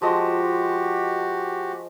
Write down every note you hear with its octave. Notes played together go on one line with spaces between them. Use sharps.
F3 G#3 F#4 G4 D#5